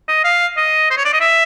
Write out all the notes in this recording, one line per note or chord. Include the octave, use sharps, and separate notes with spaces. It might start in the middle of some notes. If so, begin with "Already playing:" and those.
D#5
F5
D#5
C5
C#5
D5
D#5
E5